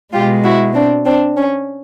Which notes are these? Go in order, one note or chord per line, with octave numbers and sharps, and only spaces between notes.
B2 G#3 F4 G4
E4 F#4
C4 D4
C4 D4
C#4